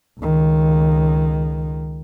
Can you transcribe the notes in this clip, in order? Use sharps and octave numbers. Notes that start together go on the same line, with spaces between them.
C#2 D#3